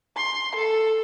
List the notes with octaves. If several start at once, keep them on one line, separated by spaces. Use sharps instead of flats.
C6
A4